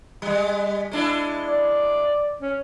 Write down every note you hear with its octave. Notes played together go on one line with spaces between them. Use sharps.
G3 G#3
G#3 D4 E4
D5
C#4